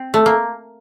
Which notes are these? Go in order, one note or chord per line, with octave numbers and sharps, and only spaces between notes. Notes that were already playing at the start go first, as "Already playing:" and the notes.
Already playing: C4
A3
A#3